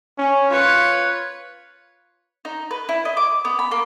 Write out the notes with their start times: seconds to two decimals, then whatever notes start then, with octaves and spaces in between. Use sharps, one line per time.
0.18 C#4
0.51 F4 B4 C#5
2.45 D#4
2.71 B4
2.89 E4
3.05 D#5
3.17 D6
3.45 B3
3.59 B5
3.71 A#3